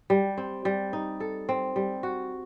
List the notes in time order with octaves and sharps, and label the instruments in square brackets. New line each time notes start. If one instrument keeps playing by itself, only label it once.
[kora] G3
C4
G3
D#4
A4
C4
G3
F#4